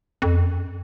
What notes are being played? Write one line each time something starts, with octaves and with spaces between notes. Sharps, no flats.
F2
F#2